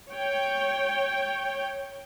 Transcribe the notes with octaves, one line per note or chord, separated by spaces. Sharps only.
C#5 G5